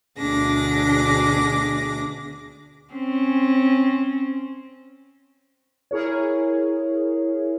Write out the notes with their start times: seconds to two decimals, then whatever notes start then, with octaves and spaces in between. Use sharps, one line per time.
0.19 D2 B2 D4 G#4 D6 A#6
2.93 C4 C#4
5.91 E4 G#4 A#4 C#5